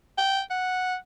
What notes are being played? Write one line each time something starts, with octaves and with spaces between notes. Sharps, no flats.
G5
F#5